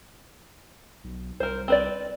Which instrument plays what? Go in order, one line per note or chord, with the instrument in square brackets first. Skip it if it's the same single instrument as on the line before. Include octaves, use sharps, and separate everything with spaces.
[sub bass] B1
[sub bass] C2 [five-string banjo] A#4 C5
[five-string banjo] C4 B4 D5